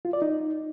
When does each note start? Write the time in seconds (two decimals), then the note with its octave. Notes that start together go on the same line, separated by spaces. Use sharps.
0.05 F4
0.13 D5
0.22 D#4